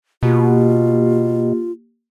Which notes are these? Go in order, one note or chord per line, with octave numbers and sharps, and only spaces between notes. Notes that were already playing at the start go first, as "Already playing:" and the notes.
B2 A#3 F4 G4